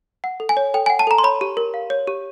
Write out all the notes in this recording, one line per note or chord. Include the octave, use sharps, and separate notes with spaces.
F#5
A4
G#5
C#5
A4 G5
F#5 G#5
A5
A4 A#5
C6
C#5 B5
G4
A#4
F5
C#5
G4